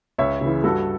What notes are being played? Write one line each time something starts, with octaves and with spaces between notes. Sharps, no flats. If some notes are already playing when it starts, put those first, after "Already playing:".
C#2 C#5 E5
C#3 E3
G2 F#4 A4